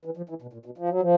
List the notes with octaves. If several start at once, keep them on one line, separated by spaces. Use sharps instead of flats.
E3
F3
E3
B2
A#2
B2
F3
F#3
F3